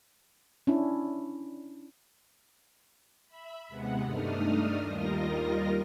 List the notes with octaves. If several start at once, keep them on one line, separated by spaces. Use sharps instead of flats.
C#4 D4 E4
E5 B5
D#2 C3 G#3 B3 F#5
G2 A3 D4 D#4 D#6 F6
D#2 G3 F4 A#4 D#5 A#6